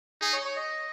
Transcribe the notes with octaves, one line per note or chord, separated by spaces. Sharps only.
D#4 G#4
C#5
C#5
D#5